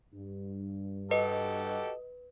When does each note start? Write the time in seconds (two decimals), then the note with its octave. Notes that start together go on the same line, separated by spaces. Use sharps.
0.14 G2
1.11 F#4 G4 A4 B4 D#5